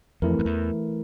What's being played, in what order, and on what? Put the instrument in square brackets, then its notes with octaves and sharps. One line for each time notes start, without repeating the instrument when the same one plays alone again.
[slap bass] F2 [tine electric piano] E3 A3 E4 A#4
[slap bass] F2
E2